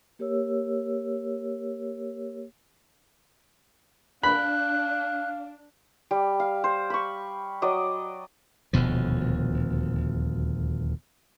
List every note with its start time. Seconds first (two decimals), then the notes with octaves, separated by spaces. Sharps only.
0.19 A#3 G4 A#4 C#5 E6
4.23 D4 F5 B5 F#6
6.11 G3
6.40 F5
6.64 C5
6.90 B5 C#6
7.62 F#3 D5 D#5
8.73 D#1 D2 B2 F3